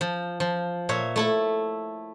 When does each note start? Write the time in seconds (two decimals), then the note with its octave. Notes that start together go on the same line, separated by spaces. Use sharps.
0.01 F3
0.40 F3
0.89 A#2 C#5 E5
1.16 A3 E4 A4